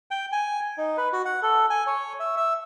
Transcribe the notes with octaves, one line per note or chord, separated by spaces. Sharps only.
G5
G#5
D#4
B4
F#4
F#5
A4
G#5
C#5
E5
E5